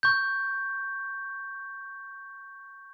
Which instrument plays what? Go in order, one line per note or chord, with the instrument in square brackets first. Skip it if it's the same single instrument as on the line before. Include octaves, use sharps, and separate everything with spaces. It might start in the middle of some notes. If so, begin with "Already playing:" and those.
[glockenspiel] C#6 G6